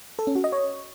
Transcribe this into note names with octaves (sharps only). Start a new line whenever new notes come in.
A4
C#4
F#4
D#5
C#5